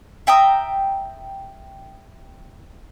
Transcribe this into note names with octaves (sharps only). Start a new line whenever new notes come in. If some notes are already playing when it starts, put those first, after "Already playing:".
E5 G5 A#5 D#6